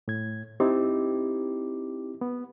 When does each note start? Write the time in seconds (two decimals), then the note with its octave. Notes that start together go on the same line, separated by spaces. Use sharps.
0.08 A2 G#6
0.60 C4 D#4 E4 G4
2.21 B3